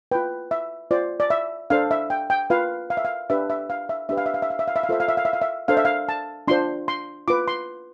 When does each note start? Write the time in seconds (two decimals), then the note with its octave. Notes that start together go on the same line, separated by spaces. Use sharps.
0.12 F4 B4 G5
0.51 E5
0.91 F4 C5 D5
1.20 D5
1.30 E5
1.70 D4 A4 C5 F5
1.91 E5
2.10 G5
2.30 G5
2.50 F4 B4 F5
2.90 F5
2.97 E5
3.05 F5
3.30 D4 G4 B4 E5
3.50 E5
3.70 F5
3.89 E5
4.09 D4 G4 B4 E5
4.17 F5
4.26 E5
4.34 F5
4.42 E5
4.50 F5
4.59 E5
4.68 F5
4.76 E5
4.83 F5
4.89 F4 A4 C5 E5
5.00 F5
5.08 E5
5.17 F5
5.25 E5
5.33 F5
5.41 E5
5.68 D4 A4 C5 F5
5.77 E5
5.85 F5
6.09 A5
6.48 D4 F4 C5 C6
6.88 C6
7.28 F4 B4 D6
7.48 C6